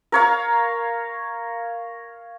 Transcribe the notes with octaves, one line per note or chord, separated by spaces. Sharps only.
A#4 C#5 F5